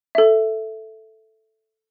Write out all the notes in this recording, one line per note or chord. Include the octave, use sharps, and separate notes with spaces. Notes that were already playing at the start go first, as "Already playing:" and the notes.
A4 E5